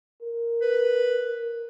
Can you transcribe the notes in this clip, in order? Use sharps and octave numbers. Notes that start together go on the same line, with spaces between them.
A#4
B4